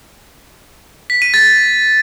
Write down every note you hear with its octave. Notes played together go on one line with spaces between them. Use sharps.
B6
D#7
A6